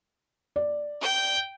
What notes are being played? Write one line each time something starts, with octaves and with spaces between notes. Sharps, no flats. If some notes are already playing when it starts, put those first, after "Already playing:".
D5
G5 G6